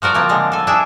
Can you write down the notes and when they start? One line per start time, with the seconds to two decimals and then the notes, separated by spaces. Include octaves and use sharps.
0.02 F3 F#4 A#4 D5
0.14 F3 A#3 C4
0.29 D3 G#3
0.52 A4 G#5
0.67 D4 E4 G#4 E5